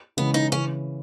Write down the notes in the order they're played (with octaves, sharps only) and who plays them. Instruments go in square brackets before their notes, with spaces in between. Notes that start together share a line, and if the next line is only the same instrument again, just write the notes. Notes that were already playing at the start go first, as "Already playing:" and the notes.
[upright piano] C#3 E3 G#3 [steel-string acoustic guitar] B3
[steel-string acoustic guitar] D#4
[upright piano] C#3 E3 [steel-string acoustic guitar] C#4